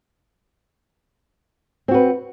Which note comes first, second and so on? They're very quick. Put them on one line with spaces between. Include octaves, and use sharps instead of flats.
C4 F#4 B4